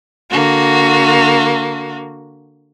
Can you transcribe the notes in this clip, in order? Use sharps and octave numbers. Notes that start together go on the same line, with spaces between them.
D3 A#3 F#4